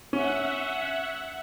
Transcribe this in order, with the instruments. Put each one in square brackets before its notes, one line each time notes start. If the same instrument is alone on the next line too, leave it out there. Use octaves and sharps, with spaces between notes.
[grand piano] C#4 [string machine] E5 F#5